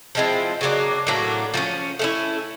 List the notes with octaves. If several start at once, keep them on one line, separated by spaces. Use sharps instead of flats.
F3 G#3 C4 E4
C#3 F#3 A#3 D4
A2 F#3 A#3 D4
F3 A#3 C#4
A3 C#4 E4